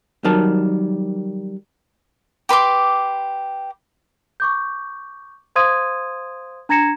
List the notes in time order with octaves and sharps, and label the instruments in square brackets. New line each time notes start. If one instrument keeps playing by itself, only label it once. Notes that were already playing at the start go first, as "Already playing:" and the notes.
[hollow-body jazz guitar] D#3 F#3 G3 A#4 A5
[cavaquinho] G4 B4 C6 D6
[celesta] C#6 D6 G6
C5 F5 C6 D#6 G#6 D#7
D4 A#5 G#6 A#6 C#7 E7